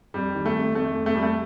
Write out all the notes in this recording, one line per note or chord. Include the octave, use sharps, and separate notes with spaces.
F2 G3
D#3
A3
F2
F2 A3
F2
A3
F2 G3
A3